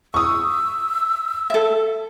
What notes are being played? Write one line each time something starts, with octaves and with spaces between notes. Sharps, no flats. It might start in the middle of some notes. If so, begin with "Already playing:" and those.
C#6 D#6 E6
A4 E5